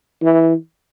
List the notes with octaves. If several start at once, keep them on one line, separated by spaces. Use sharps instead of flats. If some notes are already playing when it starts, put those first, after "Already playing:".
E3